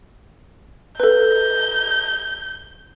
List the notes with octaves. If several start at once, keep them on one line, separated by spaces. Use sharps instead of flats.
A4 B4 G6